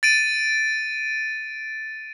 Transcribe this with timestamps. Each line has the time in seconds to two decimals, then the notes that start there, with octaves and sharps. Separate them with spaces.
0.03 A6 D7 D#7